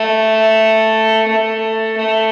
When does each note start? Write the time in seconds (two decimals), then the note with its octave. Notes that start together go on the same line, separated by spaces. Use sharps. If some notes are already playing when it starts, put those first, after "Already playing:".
Already playing: A3
1.28 A3
1.97 A3